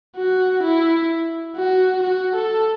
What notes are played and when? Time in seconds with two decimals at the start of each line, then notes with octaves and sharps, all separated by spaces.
0.16 F#4
0.63 E4
1.56 F#4
2.03 F#4
2.35 A4